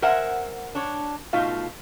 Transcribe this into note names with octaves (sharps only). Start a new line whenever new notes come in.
A#4 C5 E5 F#5 G#5
D4 C#5
B2 A3 D#4 F4 F5